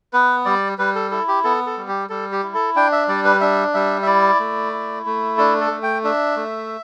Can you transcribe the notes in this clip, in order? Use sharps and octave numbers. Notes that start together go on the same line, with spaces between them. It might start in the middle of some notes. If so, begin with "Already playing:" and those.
B3 B4
G3 D5
G3 B4
A4
E4 A4
G4
B3 A4
A4
G3
G4
G3 A4
G4
E4
A4
D4 G5
E5
G3 D5
B4
D4 E5
G3 E5
E5
E4 D5
A3
E4
A3
D4 A4
A4
A3
G5
D4 E5
A3